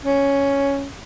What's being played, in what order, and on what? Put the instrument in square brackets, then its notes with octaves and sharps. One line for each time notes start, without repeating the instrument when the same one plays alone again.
[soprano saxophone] C#4